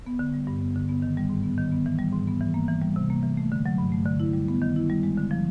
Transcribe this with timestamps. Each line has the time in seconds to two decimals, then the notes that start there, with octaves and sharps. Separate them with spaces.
0.06 B3
0.19 D3
0.34 G3
0.47 G2
0.61 B3
0.76 D3
0.89 B3
1.02 D#3
1.17 G3
1.30 G#2
1.43 B3
1.58 D#3
1.72 B3
1.86 E3
1.99 G3
2.12 G#2
2.27 B3
2.41 E3
2.54 A#3
2.68 E3
2.82 G3
2.96 C3
3.10 A#3
3.23 E3
3.37 A3
3.52 D3
3.66 F#3
3.78 G2
3.92 A3
4.06 D3
4.20 E4
4.33 G3
4.48 B3
4.62 D#3
4.76 E4
4.90 G3
5.03 G#3
5.17 D3
5.31 F3